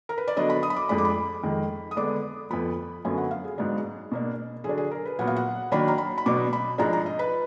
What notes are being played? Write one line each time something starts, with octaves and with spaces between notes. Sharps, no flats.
A#4
B4
D5
D3 F#3 B3 D4 D#5
B5
D#6
B5
D6
F2 F3 G#3 D4 B5
D6
B5
F2 D#3 G#3
D#6
D3 G#3 B3 D4 D6
F2 F3 B3 B5
F#2 D3 F#3 B3 G#5
F#5
F5
G#4
G#2 F#3 B3 D4
B2 A#3 D4
D3 F#3 D4 G#4
G#4
A#4
B4
A#2 F#3 B3 F#5
F5
F#5
D#3 F#3 A#3 D4 B5
A#5
B5
B5
B2 F#3 B3 D4 D6
B5
G#2 F3 G#3 D4 A#5
A#5
D#5
B4